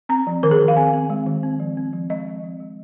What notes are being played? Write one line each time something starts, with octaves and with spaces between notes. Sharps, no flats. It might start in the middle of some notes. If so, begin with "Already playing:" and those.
C4 A#5
F3
D#3 A#4
G#4
D#3
F5
C4 G#5
C4
G#3
D#3
C4
F3
C4
F3
G#3 D#5
C4
F3
G#3